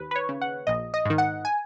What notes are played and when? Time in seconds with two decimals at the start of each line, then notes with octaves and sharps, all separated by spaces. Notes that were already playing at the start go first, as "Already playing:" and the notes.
Already playing: D#2 B4
0.11 B4
0.15 C#5
0.29 C#3
0.41 F#5
0.67 A#1 D#5
0.94 D#5
1.05 G#2 D#3
1.18 F#5
1.45 G#5